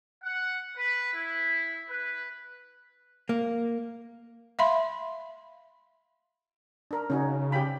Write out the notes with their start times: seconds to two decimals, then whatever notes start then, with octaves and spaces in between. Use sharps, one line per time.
0.23 F#5
0.77 B4
1.14 E4
1.89 B4
3.29 A#3
4.59 E5 F5 B5 C6
6.91 D4 A#4
7.10 C#3 C#4 D#4 F#4
7.52 G4 G5 B5